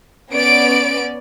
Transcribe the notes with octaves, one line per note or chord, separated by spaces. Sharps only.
B3 C#4 D5 D7